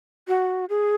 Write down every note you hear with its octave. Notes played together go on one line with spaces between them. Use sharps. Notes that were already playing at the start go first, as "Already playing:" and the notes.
F#4
G#4